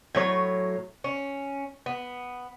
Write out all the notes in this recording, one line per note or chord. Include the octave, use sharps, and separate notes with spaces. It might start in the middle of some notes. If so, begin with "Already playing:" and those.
A2 F#3 C#5
C#4
B3